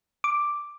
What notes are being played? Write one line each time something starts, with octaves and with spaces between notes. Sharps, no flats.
D6